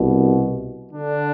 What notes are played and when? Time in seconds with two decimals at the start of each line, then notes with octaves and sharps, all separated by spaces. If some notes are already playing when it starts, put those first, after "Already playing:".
Already playing: C2 B2
0.91 D3 D4